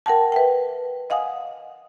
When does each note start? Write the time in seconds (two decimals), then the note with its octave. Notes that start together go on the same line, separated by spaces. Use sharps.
0.06 A#4 F#5 G5 A5
0.32 B4 E5 F#5 G5
1.10 D#5 F5 F#5 G#5 D#6